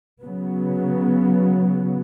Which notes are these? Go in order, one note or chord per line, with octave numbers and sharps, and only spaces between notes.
C#3 F#3 B3